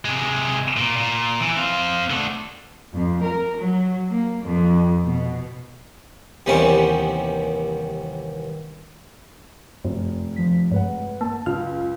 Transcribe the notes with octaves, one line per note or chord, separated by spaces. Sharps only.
C3 G#3
A#2
A#2
E3
C4 F5
D3 A3
F2
A#4
F#3
A#3
F2
B2
D#2 C3 E3 G3 B3 C#4
F1 F#2
F3 B6
G2 G#3 B4 F#5
A#3 A5
C#2 F#2 F6